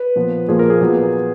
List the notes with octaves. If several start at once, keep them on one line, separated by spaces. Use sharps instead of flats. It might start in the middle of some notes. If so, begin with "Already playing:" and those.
Already playing: B4
A#2 F3 B3
A#2 F3 A#3 G#4
A#4
G#4
A#2 F#3 B3